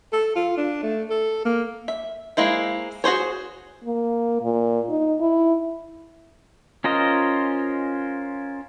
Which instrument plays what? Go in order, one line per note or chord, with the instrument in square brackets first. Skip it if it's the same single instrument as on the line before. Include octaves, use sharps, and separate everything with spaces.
[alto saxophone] A4
F4
D4
A3
A4
A#3
[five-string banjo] E5
G#3 A#3 E4 C5
F#4 G#4 C5 C#5
[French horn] A#3
A#2
D#4
E4
[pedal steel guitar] C#4 F4 A#4 C5 D#5